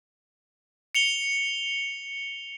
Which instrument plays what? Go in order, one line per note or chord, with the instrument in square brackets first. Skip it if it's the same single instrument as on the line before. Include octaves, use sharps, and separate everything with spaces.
[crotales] C#7 F7 G7